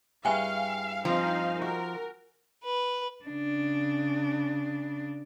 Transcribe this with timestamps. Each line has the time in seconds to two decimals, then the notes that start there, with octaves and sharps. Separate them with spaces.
0.25 G2 E4 G#4 F5 G5 G#5
1.05 F3 C4 D#4 F5
1.62 F#4 A#4
2.64 B4
3.25 C#3 D4